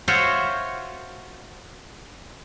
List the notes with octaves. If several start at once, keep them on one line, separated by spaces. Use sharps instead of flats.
F4 F#4 C5 C#5 E5